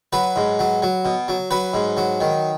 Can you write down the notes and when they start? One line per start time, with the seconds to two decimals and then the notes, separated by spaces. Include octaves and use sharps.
0.13 F#3 B4
0.36 G#2
0.59 F#3
0.82 F#3
1.05 B2
1.28 F#3
1.51 F#3 B4
1.74 G#2
1.97 F#3
2.21 D#3